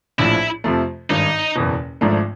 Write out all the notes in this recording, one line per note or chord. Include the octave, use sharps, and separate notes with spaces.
A#1 A2 F3 E4
F2 C3 F3 A3
G#1 G2 D#3 D#4
F#1 E2 B2
G#1 G#2 F3 A3 D4